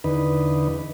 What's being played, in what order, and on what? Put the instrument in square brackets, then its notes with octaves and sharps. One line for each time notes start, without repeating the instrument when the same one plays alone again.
[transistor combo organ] E2 D3 D#4 B4